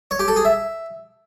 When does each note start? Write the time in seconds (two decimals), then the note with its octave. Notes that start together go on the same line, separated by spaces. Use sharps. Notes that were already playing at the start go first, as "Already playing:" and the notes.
0.11 C#5
0.19 G4
0.28 A4
0.36 G#4
0.45 E5